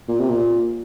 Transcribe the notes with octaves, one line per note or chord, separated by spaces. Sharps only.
A#2
C3
A#2